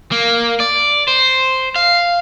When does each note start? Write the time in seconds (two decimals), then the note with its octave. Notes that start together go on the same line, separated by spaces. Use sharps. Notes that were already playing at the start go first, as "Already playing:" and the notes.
0.12 A#3
0.60 D5
1.08 C5
1.76 F5